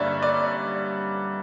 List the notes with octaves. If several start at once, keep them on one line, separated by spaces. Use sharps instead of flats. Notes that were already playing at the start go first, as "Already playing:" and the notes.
Already playing: G2 D3 G3 A#3 C#4 C#5 D5 E5
D5